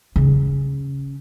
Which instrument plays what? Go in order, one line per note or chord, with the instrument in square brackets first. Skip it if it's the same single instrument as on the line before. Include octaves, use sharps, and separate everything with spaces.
[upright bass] C#3 C#4